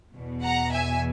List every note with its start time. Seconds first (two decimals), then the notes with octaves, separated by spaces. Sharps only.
0.14 E2 B2
0.42 F#5 A#5
0.71 E5 G#5